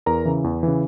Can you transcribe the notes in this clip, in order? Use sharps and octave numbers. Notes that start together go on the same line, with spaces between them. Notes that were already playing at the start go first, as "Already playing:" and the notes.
E2 A#4 A#5
C#3 E3
E2
C#3 E3